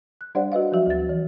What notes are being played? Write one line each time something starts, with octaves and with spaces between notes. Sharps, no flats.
F#6
G3 D4 G4 C5 D5 F#5
F#4 B4 D#5 F5
F3 F#3 F#4 E5
D2 A6
E3